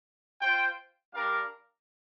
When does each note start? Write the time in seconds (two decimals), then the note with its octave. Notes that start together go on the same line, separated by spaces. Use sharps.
0.41 F4 C5 G5
1.14 G3 D4 A#4 F5